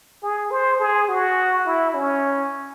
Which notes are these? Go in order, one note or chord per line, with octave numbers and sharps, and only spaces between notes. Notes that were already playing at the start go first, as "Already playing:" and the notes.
G#4
C5
G#4
F#4
E4
C#4